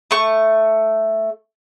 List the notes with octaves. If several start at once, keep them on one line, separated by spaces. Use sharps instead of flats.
A3 C#6